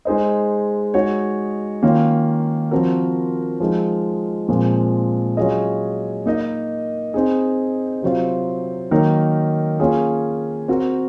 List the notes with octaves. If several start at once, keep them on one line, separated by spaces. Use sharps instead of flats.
G#3 D#4 G#4 C5 D#5
G#3 D#4 F#4 C#5
D#3 A#3 C#4 F4
F3 C4 F#4 A#4
F3 G#3 D#4
A#2 F3 G#3 C4
F#3 C#4 F4 G#4 D#5
A#3 D#4 A#4 D#5
C4 D#4 G#4
C3 F#3 C4 F4
D#3 F#3 A#3 D#4 A#4
A#3 C#4 F4 G#4
C4 F#4 A#4